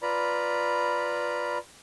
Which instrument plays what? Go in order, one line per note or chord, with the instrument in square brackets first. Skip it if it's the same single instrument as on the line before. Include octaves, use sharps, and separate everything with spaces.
[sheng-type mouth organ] F4 B4 D5 A#5 B5